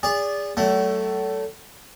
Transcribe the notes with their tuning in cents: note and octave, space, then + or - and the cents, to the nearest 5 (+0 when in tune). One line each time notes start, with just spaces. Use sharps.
G#4 -30 D5 -20
F#3 +40 A3 +5